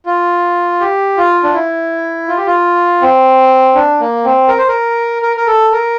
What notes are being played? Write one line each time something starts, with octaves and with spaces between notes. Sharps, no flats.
F4
G4
F4
D4
E4
F4
G4
F4
C4
D4
A#3
C4
A#4
C5
A#4
A#4
A#4
A4
A#4